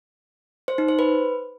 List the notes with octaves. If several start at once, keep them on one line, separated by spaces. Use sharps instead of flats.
C5
D#4
C5
B4